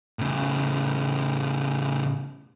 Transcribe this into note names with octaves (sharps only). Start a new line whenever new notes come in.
A2 C#3